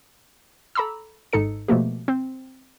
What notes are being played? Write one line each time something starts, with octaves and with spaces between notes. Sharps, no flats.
A4 A#5 B5 D6 E6
G#1 G#2 D#4 A4 C#7
B2 F3 A3 A#3 G4
C4